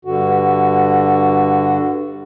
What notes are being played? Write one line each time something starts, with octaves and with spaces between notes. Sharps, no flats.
G2 D3 F#4